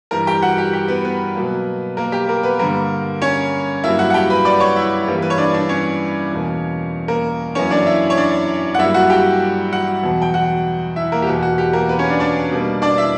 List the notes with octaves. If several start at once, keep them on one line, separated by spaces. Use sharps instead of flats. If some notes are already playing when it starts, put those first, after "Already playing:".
G2 E3 G3 A#4 A#5
G4 G5
F#4 F#5
G4
G4
B3 B4
B3 B4
B2 F#3 A#3
A#3 A#4
G4
A#3 A#4
B3 B4
G2 D3 G3 A#3 A#4
C#4 C#5
G2 F#3 A#3 E4 E5
F#4 F#5
F#5
G4 G5
B4 B5
D5 D6
C#5 C#6
E4 E5
G2 E3 G3 A#3
B4
C#5
D4 D5
D4 D5
C#4 C#5
E2 B2 A#3
A#3 A#4
F#2 E3 A#3 C#4 C#5
D4 D5
E4 E5
C#5
D4 D5
F#5
G2 F#3 A#3 E4 E5
F#4 F#5
G4 G5
F#4 F#5
E2 B2 F#3
G5
F#4 F#5
E4 E5
A#3 A#4
G4
E2 B2 A#3 F#4
F#4
G4
A#3 A#4
B3 B4
C#4 C#5
D4 D5
D4 D5
B2 G3 A#3
D4 D5
E4 E5